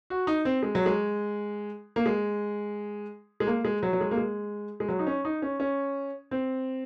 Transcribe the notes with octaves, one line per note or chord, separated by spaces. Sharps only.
F#4
D#4
C4
G#3
F#3
G#3
A#3
G#3
G#3
A#3
G#3
F#3
F#3
G#3
A#3
G#3
G#3
F#3
D#4
C#4
D#4
C#4
C#4
C4